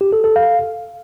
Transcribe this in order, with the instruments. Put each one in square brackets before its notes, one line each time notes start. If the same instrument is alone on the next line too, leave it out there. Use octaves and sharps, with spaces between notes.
[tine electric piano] G4
A4
A4
F5